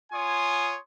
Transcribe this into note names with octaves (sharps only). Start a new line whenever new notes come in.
F4 C#5 G#5 C6 D#6